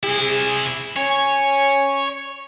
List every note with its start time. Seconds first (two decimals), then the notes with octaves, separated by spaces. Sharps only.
0.03 C3 E4 G#4
0.97 C#4 C#5